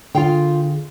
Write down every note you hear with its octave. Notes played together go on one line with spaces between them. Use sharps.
D3 F4 G#4 F5 G5